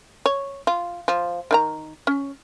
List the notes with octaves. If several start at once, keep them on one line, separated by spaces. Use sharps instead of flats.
C#5
F4
F3
D#3 E4 A#5
C#4